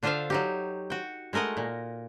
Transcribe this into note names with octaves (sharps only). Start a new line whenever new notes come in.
D3 D4 F4 C5 E5 F5
F#3 D#4 G4
F#4 G5
G#3 A3 A#4 D#5 F#5
A#2